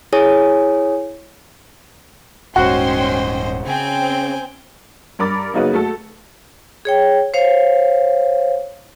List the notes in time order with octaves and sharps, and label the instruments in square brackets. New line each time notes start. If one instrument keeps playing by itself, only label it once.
[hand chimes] E4 G#4 C#5 G#5 D#6
[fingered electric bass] D#1 G#2 [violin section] C#4 G5 C6 [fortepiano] F#4 [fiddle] C5 D#5
[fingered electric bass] C#3 [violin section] C4 [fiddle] G5 G#5
[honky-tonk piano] G2 A#4 B5 D6 A6
C#3 F#3 A#3 D#4 F#4 B4
A3 F#4 A4
[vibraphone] G#4 C#5 G5
C5 C#5 F5